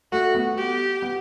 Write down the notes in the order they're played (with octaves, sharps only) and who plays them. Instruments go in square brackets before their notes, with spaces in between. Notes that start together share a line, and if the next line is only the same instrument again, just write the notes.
[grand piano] A3 [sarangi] F#4
[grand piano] B3
[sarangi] G4
[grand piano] B3